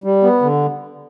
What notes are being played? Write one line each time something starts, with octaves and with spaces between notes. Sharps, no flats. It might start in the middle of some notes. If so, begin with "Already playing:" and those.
G3
B3
D3